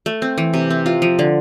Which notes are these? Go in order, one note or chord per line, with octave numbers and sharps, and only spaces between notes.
A3
C4
E3
C3
C4
F4
F3
D3